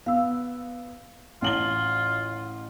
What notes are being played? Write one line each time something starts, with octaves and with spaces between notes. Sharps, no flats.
B3 F5 E6
A1 F4 F#7 G7